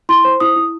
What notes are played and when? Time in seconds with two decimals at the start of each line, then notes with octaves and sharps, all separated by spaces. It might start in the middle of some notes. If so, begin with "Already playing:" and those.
0.09 E4 C6
0.25 C5
0.40 E4 D#6
0.56 E4